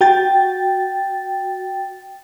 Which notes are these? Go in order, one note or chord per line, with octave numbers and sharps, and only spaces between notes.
F#4 G5 A6